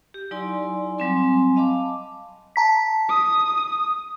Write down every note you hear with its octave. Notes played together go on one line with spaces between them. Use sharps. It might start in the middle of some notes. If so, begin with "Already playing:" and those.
G4
F#3 D#4 E4 D5 G#5 C6
F#3 G3 C4 G#5 C6 D6
D#5 F5 A5 B5 D6
A5 A#5 B6
D#6